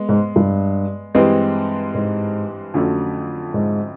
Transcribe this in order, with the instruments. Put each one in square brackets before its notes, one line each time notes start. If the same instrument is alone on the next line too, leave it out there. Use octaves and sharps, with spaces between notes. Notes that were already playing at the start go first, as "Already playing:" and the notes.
Already playing: [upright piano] G#3 B3
[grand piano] G#2
G2
[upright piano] G2 E3 G#3 C4
[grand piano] G#2
[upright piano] F2 D3 F#3 A3 C#4
[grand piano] G#2